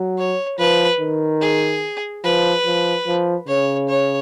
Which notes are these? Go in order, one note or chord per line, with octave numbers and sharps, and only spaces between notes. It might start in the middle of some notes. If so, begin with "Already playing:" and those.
Already playing: F#3
C#5
F3 B4
D#3
G#4
F3 B4
F3
F3
C#3 C#5
C#5